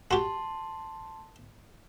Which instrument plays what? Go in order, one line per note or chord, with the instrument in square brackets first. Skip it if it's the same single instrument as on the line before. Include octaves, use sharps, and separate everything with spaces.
[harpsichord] F#4 G4 [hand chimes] A5 C6